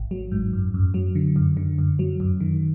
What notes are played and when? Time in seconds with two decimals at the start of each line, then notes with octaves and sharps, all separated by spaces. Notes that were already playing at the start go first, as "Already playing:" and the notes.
Already playing: G#1
0.11 F#3
0.32 G#2
0.53 F#2
0.74 F#2
0.94 F#3
1.15 D3
1.36 F#2
1.57 D3
1.78 F#2
1.99 F#3
2.20 F#2
2.40 D#3